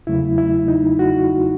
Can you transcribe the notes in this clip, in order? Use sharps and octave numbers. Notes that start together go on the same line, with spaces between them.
E2 C#3 F#3 A3 E4
E4
D#4
F#4